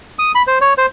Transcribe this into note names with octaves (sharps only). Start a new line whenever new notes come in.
D#6
B5
C5
C#5
C5